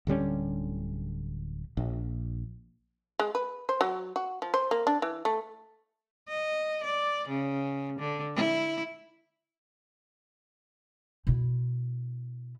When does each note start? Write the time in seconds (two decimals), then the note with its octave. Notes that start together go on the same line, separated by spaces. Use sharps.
0.07 D1 D3 G3 C#4
1.77 A#1
3.19 G#3
3.35 B4
3.69 C5
3.81 F#3
4.16 F#4
4.42 F3
4.54 C5
4.71 A#3
4.87 D4
5.02 E3
5.25 A3
6.28 D#5
6.84 D5
7.28 C#3
7.99 D3
8.35 E4
11.27 B2 E4